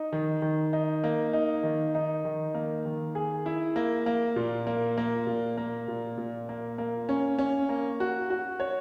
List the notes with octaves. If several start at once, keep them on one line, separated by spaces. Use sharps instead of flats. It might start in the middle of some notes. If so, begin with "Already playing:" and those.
Already playing: D#4
D#3
D#3
D#4
A#3
D#4
D#3
D#4
D#3
A#3
D#3
G#4
E4
A#3
A#3
A#2
A#3
A#3
A#2
A#3
A#2
A#2
A#3
A#3
C#4
C#4
A#3
F#4
F#4
C#5